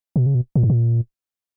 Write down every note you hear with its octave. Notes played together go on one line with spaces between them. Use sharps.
B2
C#3
B2
A#2
G#2
A#2